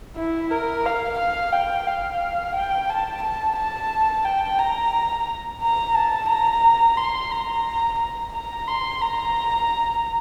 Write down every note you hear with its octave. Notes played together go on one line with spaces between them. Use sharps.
E4
A#4
F5
F5
G5
F5
G5
A5
A5
A5
G5
A#5
A#5
A5
A#5
C6
A#5
A#5
A#5
C6
A#5